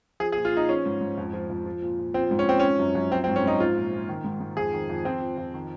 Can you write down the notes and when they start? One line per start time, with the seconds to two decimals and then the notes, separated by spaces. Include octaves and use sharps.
0.20 F3 G#4
0.32 G#4
0.37 A#2
0.45 F4
0.53 A#2 D#4
0.69 F3 C#4
0.86 G#2
1.01 G#2
1.18 F2
1.33 F3
1.50 F2
1.66 F3
1.82 A#2
1.98 A#2
2.14 F3 C4
2.31 G#2
2.39 C#4
2.47 G#2 C4
2.59 F3 C#4
2.79 F#2
2.95 F#2
3.11 F3 C4
3.24 C4
3.28 G#2
3.36 C#4
3.44 G#2 D#4
3.60 F3 F4
3.76 A#2
3.93 A#2
4.09 D#3
4.24 G#2
4.41 G#2
4.57 F2 G#4
4.73 D#3
4.89 F2
5.05 F2 C4
5.22 F3
5.38 F2
5.54 D#3